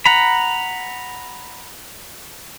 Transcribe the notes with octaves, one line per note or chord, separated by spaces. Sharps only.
F#5 A#5 B5